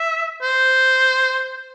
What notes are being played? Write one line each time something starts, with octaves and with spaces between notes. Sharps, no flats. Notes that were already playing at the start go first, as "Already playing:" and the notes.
Already playing: E5
C5